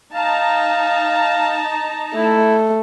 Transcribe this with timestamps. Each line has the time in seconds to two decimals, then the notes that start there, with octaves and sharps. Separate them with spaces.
0.14 D#4 F5 A5 A#5
2.15 A3 E4